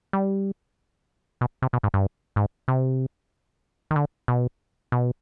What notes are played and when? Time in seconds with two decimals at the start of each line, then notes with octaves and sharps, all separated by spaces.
0.13 G3
1.41 B2
1.62 C3
1.73 B2
1.83 G#2
1.94 G2
2.36 G#2
2.68 C3
3.91 D#3
3.96 D3
4.28 B2
4.92 B2